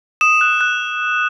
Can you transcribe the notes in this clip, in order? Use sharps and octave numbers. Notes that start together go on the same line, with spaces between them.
D#6 E7
F#6
F#6